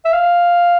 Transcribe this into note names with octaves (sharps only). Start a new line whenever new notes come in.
E5
F5